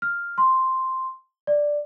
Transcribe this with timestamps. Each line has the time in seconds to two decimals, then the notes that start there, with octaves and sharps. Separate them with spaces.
0.02 F6
0.38 C6
1.47 D5